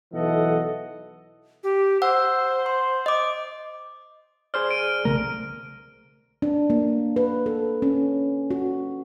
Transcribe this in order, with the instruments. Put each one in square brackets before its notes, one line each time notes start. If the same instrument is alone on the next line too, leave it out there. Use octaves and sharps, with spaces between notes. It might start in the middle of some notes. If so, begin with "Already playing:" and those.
[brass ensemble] B1 E3 A4 D#5 F#5
[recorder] G4
[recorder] C5 [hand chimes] F#5 E6
[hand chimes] C6
D#5 D6
[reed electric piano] G#4 C5 D5 [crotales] F6
[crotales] D7 D#7
[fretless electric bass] B1 C#3 A3 [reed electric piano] A#4
[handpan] D4
A#3
B4
A4
C#4
F#4